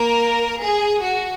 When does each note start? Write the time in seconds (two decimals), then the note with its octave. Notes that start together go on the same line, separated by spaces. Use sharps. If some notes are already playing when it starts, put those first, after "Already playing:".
Already playing: A#3 A#4
0.61 G#4
1.03 F#4